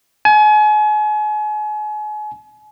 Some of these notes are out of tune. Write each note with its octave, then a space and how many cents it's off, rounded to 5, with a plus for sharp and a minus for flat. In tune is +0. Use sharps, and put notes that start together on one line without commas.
G#5 +35